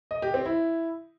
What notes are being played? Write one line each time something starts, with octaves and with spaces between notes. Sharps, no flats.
D#5
G4
C4
E4